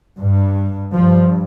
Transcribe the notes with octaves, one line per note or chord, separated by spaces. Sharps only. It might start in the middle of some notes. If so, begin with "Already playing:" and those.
G2
G2 F3